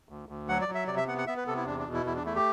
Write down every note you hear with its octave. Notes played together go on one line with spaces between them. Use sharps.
D2
D2
F#3 F#5
D5
F#3
E5
C3 D5
E5
B3 F#5
F#5
B3 E5
B4
C3 A4
E4
E2 D4
D4
B2
E4
E2 E4
D4
A3 E4
G4